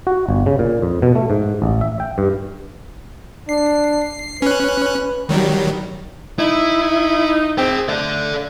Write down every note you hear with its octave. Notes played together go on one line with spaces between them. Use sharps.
F#4
G1
C#3
A#2
F2
B2
A3
G#2
A1
E5
G5
G2
D4 C7
C#4 B4 F#6
D#3 F#3 G3
D#4 E4
C4 G#4 G5
A3 A4 D5